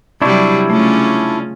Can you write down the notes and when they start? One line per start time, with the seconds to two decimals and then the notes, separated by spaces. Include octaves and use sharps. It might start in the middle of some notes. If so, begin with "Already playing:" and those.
0.22 C3 F#3 G3 D4 E4 C#5 D5
0.70 C#3 A3 C#4 F4